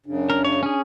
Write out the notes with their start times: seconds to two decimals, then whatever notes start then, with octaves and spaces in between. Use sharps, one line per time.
0.06 F#2 C#3 D4
0.30 A#4
0.45 C#5
0.63 C#4 G#4